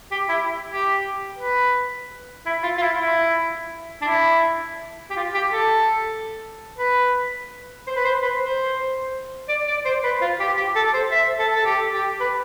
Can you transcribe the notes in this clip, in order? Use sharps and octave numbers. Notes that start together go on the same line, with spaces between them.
G4
E4
G4
B4
E4
F4
F4
E4
E4
D4
E4
G4
F4
G4
A4
B4
C5
B4
C5
B4
C5
D5
D5
C5
B4
F4
G4
G4
A4
C5
E5
A4
A4
G4
G4
B4